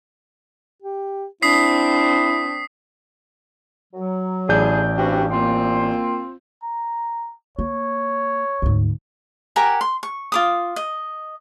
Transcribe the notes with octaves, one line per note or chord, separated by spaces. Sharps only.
G4
C4 D4 E4 D#6 B6 C7
F#3
A1 D4 E4 G#4 D5 G6
G2 C4 F#4 G4
A#3 C4 F4
A#5
A#3 C#5
D2 G#2
G4 A#4 F#5 G#5
C6
C#6
F4 D6 D#6
D#5